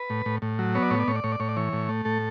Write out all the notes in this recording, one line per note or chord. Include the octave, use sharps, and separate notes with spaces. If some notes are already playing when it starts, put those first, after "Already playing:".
Already playing: B4
A2
A2
A2
F#3
B3 C#5
D5
A2 C#5
D5
A2 C#5
D5
A2 C#5
D5
A2 C#5
D5
E3 C#5
A2
A3
A2 A4